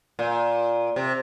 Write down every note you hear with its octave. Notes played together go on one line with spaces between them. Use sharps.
A#2
C3